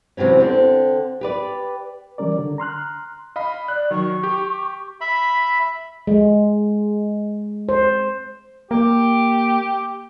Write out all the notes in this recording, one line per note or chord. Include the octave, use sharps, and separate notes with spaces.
E2 C3 E3 F#3 C#4
D3 C4
G4 B4 D5
E3 G3 C#4 A#4 D5
D3
A#5 C6 F6 F#6
D#5 F5 B5
D5 F#6
D#3 F#3 C#6
G4
E5 B5
G#3
C5
A#3 G4